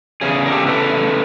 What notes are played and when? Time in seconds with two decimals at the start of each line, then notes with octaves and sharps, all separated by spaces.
0.21 E2 C#3 G#4
0.46 A#4
0.51 G4 A4
0.67 A4 B4